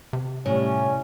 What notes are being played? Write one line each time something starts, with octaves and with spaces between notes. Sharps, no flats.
C3
A2 G3 C#4 C#5